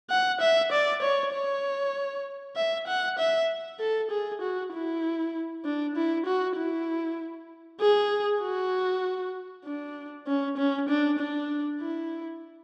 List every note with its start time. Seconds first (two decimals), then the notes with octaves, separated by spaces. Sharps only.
0.10 F#5
0.41 E5
0.72 D5
1.02 C#5
1.33 C#5
2.56 E5
2.87 F#5
3.19 E5
3.80 A4
4.11 G#4
4.41 F#4
4.73 E4
5.65 D4
5.96 E4
6.26 F#4
6.57 E4
7.81 G#4
8.42 F#4
9.65 D4
10.27 C#4
10.57 C#4
10.89 D4
11.19 D4
11.80 E4